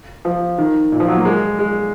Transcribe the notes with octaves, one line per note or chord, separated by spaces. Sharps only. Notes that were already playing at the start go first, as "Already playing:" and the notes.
F3
D#3
A#2
F3
F#3
A#3
G#3
G#3